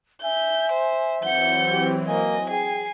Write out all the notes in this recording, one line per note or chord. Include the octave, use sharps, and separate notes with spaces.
E5 G#5 G6
C5
E3 F#3 C4 F#5 G6 C#7
G4
A#3 D#5 G#5
G#4 G5 G#5 C7